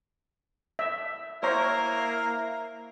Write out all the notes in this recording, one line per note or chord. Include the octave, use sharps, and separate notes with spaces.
E5
A#3 E4 A#4 C5 C#5 A#5